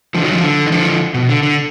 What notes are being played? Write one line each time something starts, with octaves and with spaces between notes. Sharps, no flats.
D3 F3
D#3 F#3
D3 F3
D3
D#3
D3 F3
B2
D3
D3